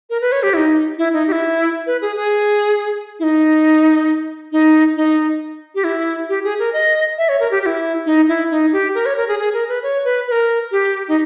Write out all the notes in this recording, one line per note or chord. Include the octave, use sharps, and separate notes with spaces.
A#4
B4
C#5
G4
E4
D#4
E4
D#4
G4
E4
B4
G#4
G#4
E4
D#4
D#4
D#4
G4
E4
G4
G#4
A#4
D#5
E5
C#5
A#4
G4
G4
E4
D#4
E4
D#4
G4
A#4
C#5
A#4
G#4
G#4
A#4
B4
C#5
B4
B4
A#4
G4
D#4